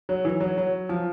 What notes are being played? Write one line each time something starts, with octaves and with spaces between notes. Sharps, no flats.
F#3
E3
F#3
F#3
F3